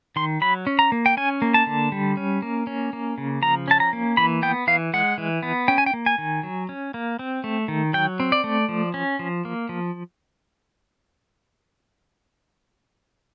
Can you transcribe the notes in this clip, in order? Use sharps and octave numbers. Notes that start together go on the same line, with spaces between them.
D#3 C6
F#3 B5
C#4
A#5
A#3
G5
C#4 G#5
A#3
A5
D3
G3
C#4
A#3
C#4
A#3
C#3
F3 A#5
C#4 A5
A#5
A#3
E3 B5
B3 G5
E3 F5
G#3 F#5
E3
B3
C#4 G5
G#5
G5
A#3
G#5
D#3
F#3
C#4
A#3
C4
A3
D#3
F#3 G5
C4
D5
A3
F3
C#4
F3
A#3
F3